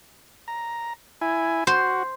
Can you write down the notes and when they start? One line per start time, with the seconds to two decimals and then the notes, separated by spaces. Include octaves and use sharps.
0.48 A#5
1.21 E4 G#5
1.67 F#4 C5